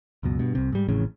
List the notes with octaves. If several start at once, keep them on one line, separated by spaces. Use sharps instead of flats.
C#2 F#2 B2
G2 B2
C2 C3
G#2 G3
A1 F2 A2 C#3